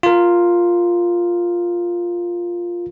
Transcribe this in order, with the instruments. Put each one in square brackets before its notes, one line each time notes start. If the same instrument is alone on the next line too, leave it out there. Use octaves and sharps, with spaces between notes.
[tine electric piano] F4 A#4